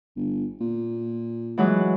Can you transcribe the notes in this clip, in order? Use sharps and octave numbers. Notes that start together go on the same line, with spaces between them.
G1
A#2
E3 F#3 G#3